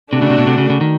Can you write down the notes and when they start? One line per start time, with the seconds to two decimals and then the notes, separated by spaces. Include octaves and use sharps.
0.13 C3 A3 D4 F#4
0.22 C#3
0.30 C3
0.38 B2
0.47 C3
0.58 C#3
0.70 C#3
0.81 D#3